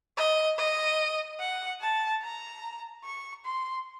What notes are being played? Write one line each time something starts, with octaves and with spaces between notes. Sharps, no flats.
D#5
D#5
F#5
A5
A#5
C#6
C6